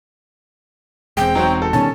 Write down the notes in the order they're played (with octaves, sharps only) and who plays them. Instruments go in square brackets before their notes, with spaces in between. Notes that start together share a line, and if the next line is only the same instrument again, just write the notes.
[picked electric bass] E1 [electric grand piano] G#3 C4 [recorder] G5
[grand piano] F#3 C4 [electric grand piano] D#4 F#4
[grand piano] A4
[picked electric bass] B2 D#3 G3 [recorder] C#4 [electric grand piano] A5